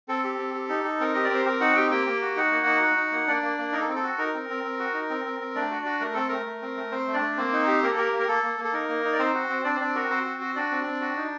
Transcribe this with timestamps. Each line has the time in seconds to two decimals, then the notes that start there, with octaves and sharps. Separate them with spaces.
0.08 C4 A4
0.24 G4
0.39 C4
0.54 G4
0.69 D#4
0.84 D#4
1.00 C4 A#4
1.14 G4 D#5
1.24 D5
1.30 C4 C5
1.46 C4 A#4
1.60 D#4 F#4 F#5
1.75 C4 G4 G5
1.91 A#3 G4 G5
2.07 A#3
2.22 F#4
2.36 D#4 F#4 F#5
2.51 A#3
2.66 D#4
2.82 F#4
2.97 D#4
3.12 A#3
3.27 A#3 D4 D5
3.42 A#3
3.58 A#3
3.72 D#4 A#4
3.80 A4
3.88 C4
3.96 A4
4.03 F#4
4.18 D#4 A#4
4.34 C4
4.49 C4
4.64 C4
4.79 F#4
4.94 D#4
5.10 C4
5.25 C4
5.40 C4
5.55 A3 D4 D5
5.71 F#4
5.85 F#4
6.00 A3 A#4
6.14 C4 A4
6.28 A3 A#4
6.46 A3
6.62 C4
6.77 A3
6.91 C4 C5
7.07 A3
7.14 D4 D5
7.21 A3
7.37 A#3 C4 C5
7.52 D#4
7.67 G4
7.83 A#3 A#4
7.91 A4
7.98 G4 A#4
8.13 A#3
8.20 A#4
8.28 A#3 A4
8.43 A#3
8.58 A#3
8.64 A4
8.73 D#4 A#4
8.89 A#3
9.05 D#4
9.13 D5
9.19 C4 C5
9.34 F#4
9.50 C4
9.64 C4 D4 D5
9.76 C5
9.80 C4 D4 D5
9.95 F#4 A#4
10.10 C4 C5
10.25 F#4
10.41 F#4
10.56 D4 F#4 D5
10.71 C4
10.87 C4
11.01 F#4
11.16 D#4